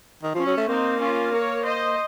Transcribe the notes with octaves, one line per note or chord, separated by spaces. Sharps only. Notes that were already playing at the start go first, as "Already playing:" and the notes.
D#3
F3 C#4
F#3
A3
A#3 C4 D#4
C#4 F4
A#4 C#5
C5 D#5